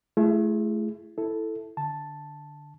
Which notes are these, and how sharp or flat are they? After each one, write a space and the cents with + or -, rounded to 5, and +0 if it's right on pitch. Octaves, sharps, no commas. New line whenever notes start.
A3 -25 E4 +35 G#4 +0
E4 +0 A4 +0
D3 +0 A5 +0